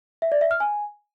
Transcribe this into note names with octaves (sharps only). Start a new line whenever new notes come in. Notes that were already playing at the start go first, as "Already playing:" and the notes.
E5
D5
E5
F6
G#5